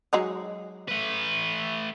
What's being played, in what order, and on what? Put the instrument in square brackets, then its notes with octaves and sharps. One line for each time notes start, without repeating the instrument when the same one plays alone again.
[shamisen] F#3 G#3 D#4
[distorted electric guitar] A3 B4